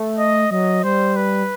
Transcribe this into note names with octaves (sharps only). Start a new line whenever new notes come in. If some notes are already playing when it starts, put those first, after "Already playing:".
Already playing: A3
D#5
F#3 D#5
G3 C5
B4